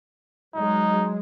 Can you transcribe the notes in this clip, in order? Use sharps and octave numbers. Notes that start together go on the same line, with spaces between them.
F#3 G#3 D#4